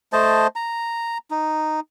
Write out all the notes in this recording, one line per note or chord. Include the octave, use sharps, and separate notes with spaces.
A3 C5 D#5 A5
A#5
D#4